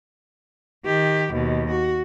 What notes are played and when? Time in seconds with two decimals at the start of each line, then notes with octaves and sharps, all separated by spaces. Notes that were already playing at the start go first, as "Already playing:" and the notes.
0.85 D#3 G4
1.33 D#2 B2
1.71 F#4